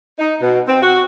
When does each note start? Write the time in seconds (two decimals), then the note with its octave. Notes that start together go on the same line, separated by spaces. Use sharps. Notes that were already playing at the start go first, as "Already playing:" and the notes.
0.19 D#4
0.42 B2
0.68 C4
0.82 F#4